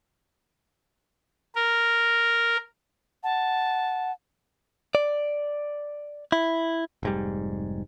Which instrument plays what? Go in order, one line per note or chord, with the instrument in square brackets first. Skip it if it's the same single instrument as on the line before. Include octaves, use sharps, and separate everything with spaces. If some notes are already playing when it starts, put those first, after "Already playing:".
[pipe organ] A#4
[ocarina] F#5 [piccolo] A5
[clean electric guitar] D5
E4
[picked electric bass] F1 G#2 G3